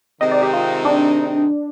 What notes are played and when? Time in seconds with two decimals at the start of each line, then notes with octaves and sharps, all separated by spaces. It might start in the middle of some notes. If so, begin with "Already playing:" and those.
0.21 C3 D#3 G#3 C4 D#4 D#5
0.32 D5
0.42 G4
0.53 F4
0.85 D4